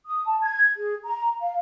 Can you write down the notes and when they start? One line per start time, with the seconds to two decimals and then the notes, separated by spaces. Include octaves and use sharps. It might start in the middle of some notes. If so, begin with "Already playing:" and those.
0.06 D#6
0.26 A5
0.42 G#6
0.77 G#4
1.04 A#5
1.41 F5